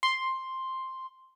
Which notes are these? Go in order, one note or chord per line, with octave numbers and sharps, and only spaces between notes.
C6